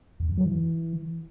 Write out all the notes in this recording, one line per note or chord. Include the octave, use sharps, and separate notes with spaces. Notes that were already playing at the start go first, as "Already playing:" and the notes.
E2
F#2
F#3
E3